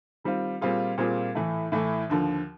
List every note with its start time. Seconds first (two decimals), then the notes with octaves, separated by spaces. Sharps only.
0.24 D#3 G3 C4 F4
0.61 A#2 G3 C4 F4 G#4
0.98 A#2 G3 C4 F4 G#4
1.35 A2 E3 A3
1.72 A2 E3 A3
2.10 D#2 D3 F3